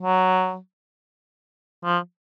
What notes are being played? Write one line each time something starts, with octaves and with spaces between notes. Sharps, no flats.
F#3
F3